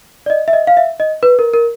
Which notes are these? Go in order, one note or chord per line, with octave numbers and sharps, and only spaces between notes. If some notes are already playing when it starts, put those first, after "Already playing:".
D5
D#5
E5
D#5
F5
E5
D#5
B4
A#4
A#4